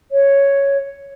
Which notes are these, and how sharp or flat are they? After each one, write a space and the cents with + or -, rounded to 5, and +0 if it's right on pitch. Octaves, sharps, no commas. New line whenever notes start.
C#5 +0